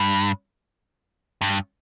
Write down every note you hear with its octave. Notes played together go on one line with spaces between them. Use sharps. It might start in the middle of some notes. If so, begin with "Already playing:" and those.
Already playing: G2
G2